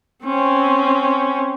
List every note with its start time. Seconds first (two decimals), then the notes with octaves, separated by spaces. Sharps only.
0.25 C4 C#4